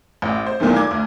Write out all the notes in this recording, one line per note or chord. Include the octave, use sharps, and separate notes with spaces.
A1
C5
B1 A#2 D#3 E3 A3
D6 G#6
D2